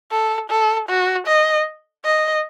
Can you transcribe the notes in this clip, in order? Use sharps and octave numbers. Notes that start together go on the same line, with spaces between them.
A4
A4
F#4
D#5
D#5